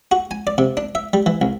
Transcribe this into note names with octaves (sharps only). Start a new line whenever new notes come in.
F#4
G#5
D5
C3
D4
E5
G3
E3
C2